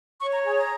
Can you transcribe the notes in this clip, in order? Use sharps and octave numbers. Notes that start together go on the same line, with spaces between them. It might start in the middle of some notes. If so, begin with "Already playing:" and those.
C#5 C#6
A#5
G#4 G#5
A#5